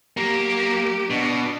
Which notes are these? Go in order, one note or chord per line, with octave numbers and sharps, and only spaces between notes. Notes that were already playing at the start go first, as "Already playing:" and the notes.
F#3 A#3 G4
B2 D4